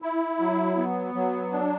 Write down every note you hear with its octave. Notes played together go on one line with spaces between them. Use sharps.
E4
F#3
B3
F#3
D4